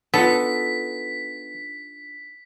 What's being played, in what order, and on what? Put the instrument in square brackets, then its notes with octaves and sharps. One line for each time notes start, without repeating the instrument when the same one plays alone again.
[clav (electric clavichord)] B3 [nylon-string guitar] D4 D#4 F4 [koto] A4 [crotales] B6